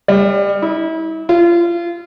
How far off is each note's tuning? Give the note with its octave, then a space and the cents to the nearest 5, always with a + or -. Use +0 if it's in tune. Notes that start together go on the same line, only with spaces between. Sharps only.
G3 +30
E4 -35
F4 -30